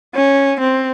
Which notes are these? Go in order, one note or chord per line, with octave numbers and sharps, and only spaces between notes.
C#4
C4